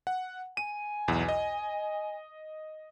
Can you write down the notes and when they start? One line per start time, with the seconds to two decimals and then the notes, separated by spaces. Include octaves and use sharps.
0.07 F#5
0.57 G#5 D#7
1.08 B1 E2
1.28 D#5